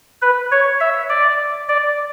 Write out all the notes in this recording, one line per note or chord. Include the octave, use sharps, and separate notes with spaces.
B4
C#5
E5
D5
D5